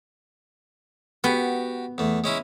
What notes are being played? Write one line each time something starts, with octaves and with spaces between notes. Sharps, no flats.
B3 F#4 G4
E2 A3
G#3 C#4 E4